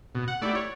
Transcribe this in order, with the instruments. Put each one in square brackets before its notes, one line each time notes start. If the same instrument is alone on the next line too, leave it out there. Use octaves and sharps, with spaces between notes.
[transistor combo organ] B2
[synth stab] F#5
[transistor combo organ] A3 E4 G4 [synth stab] D5
[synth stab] C#5